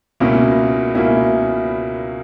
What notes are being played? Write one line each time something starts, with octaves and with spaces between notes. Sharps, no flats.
C#2 B2 A#3 C#4 E4
C#2 B2 A#3 C#4 E4